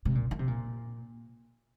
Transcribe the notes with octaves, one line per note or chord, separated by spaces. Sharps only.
C3
A#2
D#3
C3
A#2